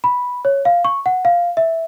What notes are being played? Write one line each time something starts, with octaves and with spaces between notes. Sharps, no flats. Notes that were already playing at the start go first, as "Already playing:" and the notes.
B5
C#5
F5
C#6
F#5
F5
E5